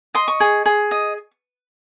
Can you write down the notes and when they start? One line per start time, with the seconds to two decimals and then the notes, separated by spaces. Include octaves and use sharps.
0.15 D#5 C6
0.28 C#6
0.40 G#4
0.66 G#4
0.91 D#5